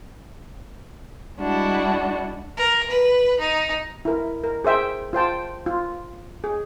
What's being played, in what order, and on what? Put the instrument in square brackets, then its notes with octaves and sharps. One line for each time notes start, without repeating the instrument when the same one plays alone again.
[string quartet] G3 G#3 D4 E4 F#4
[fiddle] A#4
B4
D#4
[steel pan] E4 A#4
A#4
G#4 C5 E5 G5
F4 C5 G5 A5
F4
G#4